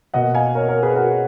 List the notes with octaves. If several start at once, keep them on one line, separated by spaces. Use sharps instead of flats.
B2 A#3 D#5 F#5
F5 G#5
A#4 C#5
A#4 C#5
G#4 B4
F#4 A#4